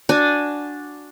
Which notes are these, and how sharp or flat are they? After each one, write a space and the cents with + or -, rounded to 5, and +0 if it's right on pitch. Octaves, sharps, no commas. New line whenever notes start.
D4 +0 F#4 -10 G#5 +0